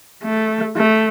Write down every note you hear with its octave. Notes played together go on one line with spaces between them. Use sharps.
A3
A3